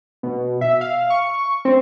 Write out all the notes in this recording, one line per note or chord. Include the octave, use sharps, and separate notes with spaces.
B2
E5
F5
C#6
C4